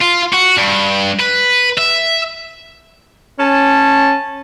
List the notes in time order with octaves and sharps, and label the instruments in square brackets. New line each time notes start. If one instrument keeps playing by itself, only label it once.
[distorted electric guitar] F4
F#4
G2
B4
E5
[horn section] C#4 A5